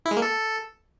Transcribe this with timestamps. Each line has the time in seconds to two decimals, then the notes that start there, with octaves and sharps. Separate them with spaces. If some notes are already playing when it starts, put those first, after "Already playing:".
0.06 E4
0.11 G#3
0.17 A#3
0.22 A4